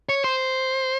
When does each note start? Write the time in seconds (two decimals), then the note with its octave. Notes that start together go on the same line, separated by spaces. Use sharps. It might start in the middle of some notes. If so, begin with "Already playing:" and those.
0.09 C#5
0.24 C5